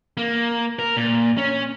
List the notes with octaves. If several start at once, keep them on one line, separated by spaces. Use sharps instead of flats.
A#3
A#4
A#2
C#4